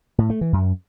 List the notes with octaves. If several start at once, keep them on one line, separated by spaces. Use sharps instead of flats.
A2
A3
E3
F#2